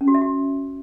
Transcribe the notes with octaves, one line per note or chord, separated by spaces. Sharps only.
C#4
F#4
E5
F#4